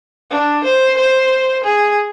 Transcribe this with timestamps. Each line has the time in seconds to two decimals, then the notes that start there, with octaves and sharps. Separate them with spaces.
0.31 D4
0.64 C5
0.97 C5
1.64 G#4